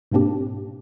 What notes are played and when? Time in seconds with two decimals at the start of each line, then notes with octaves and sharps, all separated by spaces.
0.11 G#2 B2 A#3 C4 D4 G4